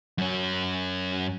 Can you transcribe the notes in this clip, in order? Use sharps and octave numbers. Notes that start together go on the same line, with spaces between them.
F#2 C#4